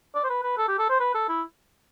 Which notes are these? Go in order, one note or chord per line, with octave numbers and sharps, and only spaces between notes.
D5
C5
B4
B4
A4
G4
A4
C5
B4
A4
E4